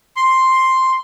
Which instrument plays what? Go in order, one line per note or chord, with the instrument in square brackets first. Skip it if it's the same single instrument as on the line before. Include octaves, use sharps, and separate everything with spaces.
[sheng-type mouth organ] C6